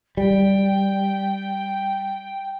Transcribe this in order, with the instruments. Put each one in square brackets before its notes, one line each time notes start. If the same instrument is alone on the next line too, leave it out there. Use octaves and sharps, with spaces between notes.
[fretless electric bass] G3 [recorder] G5